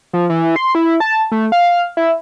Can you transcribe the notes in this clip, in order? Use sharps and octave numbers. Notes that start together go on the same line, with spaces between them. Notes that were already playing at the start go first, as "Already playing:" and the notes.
F3
E3
C6
E4
A5
A3
F5
E4